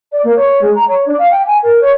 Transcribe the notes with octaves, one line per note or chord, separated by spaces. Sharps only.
D5
A#3
C#5
G#3
A#5
C#5
D4
F5
G5
G#5
A#4
C#5